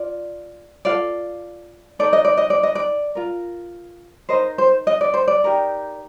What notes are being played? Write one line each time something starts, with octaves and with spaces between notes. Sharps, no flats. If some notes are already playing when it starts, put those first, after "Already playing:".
Already playing: F4 D5
F4 A4 D5 F5
D#4 A4 D5
D#5
D5
D#5
D5
D#5
D5
F4 A#4
D#4 A#4 C5 D#5
C5
D#5
D5
C5
D5
D#4 G4 A#4